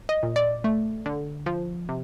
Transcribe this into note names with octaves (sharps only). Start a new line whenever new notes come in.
D#5
A#2
D5
A3
D3
F3
C3